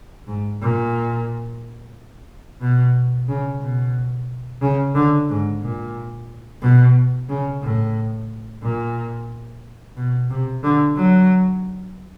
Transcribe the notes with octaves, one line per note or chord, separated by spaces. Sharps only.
G#2
A#2
B2
C#3
B2
C#3
D3
G#2
A#2
B2
C#3
A2
A#2
B2
C3
D3
F#3